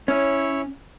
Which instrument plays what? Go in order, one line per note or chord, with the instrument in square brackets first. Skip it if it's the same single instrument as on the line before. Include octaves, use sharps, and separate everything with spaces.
[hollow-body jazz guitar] C#4 [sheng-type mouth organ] E4 C#5